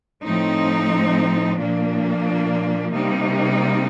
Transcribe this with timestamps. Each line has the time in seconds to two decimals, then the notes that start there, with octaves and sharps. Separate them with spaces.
0.24 A2 F3 C4 D#4
1.59 A#2 F3 A#3 D4
2.94 C3 G3 A#3 D#4